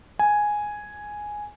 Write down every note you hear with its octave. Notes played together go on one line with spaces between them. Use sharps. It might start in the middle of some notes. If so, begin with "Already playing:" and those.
G#5